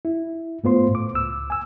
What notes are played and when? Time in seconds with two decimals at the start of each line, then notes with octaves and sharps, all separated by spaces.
0.05 E4
0.64 G#2 A3 B3 F4 C5 C6
0.91 A2 D6
1.13 C#2 E6
1.50 G#5 E6